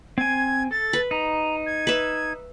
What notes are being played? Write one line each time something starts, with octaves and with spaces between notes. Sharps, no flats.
C4 G#5 G#6
A4 A6
B4
D#4 A#5
G#6
B4 E5